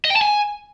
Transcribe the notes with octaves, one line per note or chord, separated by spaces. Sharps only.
D#5
G5
A5
G#5